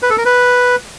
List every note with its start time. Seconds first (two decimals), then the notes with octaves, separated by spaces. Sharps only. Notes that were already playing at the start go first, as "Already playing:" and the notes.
0.02 B4
0.10 A4
0.18 A#4
0.25 B4